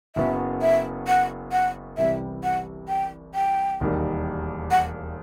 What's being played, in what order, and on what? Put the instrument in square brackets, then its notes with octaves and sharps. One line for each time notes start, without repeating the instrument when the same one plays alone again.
[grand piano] F#1 F#2 F#3 B3 [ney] E5
[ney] E5
F#5
F#5
[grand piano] C2 C3 E3 G3 [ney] E5
[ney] F#5
G5
G5
[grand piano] E1 D#2 D#3 G3
[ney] F#5